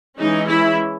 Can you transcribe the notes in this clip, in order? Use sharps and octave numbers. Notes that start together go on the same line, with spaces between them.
E3 G#3 C#4 D#4
E4